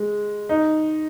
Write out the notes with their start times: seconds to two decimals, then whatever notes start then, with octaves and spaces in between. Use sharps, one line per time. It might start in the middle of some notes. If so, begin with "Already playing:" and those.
Already playing: G#3
0.49 D#4